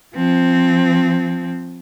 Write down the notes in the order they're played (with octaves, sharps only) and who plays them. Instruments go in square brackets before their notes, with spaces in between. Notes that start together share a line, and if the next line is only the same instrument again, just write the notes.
[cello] F3 C4